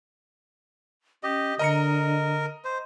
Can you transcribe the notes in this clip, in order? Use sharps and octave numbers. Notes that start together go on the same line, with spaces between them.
C#4 G4 D#5
D3 A#4 D#5 A#5 C#7
C5